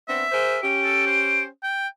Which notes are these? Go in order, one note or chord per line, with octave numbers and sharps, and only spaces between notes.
B3 C4 D4 E5
G#4 A#4 C5
C#4 G4 D7
A4
C5
G5